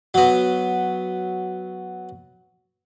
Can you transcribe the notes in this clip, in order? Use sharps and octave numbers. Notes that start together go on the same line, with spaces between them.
F#3 B3